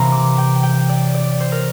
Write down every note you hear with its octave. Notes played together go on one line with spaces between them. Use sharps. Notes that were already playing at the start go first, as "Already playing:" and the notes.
Already playing: C3 E3 A#3 A#5 C6
D6
G5
G5
D5
D5
C5
A#4